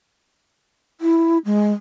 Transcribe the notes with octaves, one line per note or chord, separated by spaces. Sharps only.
E4
G#3